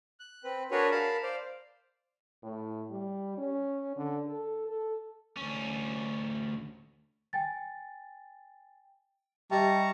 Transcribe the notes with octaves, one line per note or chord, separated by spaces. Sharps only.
F#6
C4 B4
D4 F#4 G#4 A#4 B4 C#5
A#4 F5 A5 B5
C5 D5 F5
A2
G3
C#4
D3
A4
A4
D2 C#4
G5 G#5 A6
G3 D#5 E5 A5 A#5 C#6